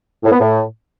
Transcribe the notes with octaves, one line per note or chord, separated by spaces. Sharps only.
A2
B3
A2